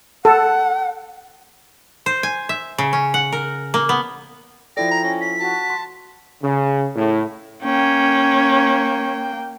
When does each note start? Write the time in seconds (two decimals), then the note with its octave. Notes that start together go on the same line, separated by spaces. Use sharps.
0.25 A4 F#5
2.06 C5
2.23 G#5
2.49 E5
2.78 C#3
2.93 C#4
3.14 F#5
3.32 A#4
3.74 A#3
3.89 B3
4.77 F3 E4 A4 D5 G5 A#6
4.91 A#5
5.04 C#4
5.21 B6
5.40 F#4 A5
5.70 C6
6.42 C#3
6.95 A2
7.64 A#3 C#4 G5